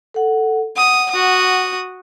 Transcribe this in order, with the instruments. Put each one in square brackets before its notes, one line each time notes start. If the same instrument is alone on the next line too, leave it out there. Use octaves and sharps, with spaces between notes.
[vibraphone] A4 F#5
[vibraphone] F#5 [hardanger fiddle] D#6
[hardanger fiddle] F#4 D#6